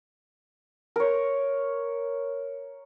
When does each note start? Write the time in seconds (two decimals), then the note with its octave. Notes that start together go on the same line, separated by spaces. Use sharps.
0.96 A#4 C#5